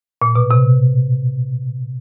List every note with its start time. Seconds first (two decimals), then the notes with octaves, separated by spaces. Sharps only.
0.22 A#2
0.35 B2
0.51 C3